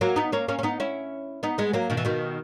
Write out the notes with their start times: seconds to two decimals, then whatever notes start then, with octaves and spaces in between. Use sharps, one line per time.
0.01 F#3 A#3
0.16 B3 D#4
0.32 A#3 C#4
0.48 A#3 C#4
0.59 C#4
0.63 B3 D#4
0.80 C#4 E4
1.43 B3 D#4
1.58 G#3 B3
1.73 F#3 A#3
1.90 B2 D#3
1.97 E3
2.05 B2 D#3